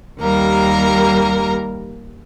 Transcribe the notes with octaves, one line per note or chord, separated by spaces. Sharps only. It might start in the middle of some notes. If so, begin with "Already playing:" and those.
D#2 G3 A#3 A#4 A#5